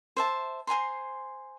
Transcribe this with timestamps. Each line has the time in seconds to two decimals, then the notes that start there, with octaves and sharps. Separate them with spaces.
0.17 C5 E5 A5
0.67 C5 G#5 A#5 C6